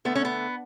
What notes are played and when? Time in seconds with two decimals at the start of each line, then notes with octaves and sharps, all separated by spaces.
0.05 D3 A3 B3
0.15 C#4
0.25 B3